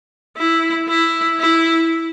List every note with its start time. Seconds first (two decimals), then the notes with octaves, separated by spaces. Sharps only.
0.37 E4
0.89 E4
1.40 E4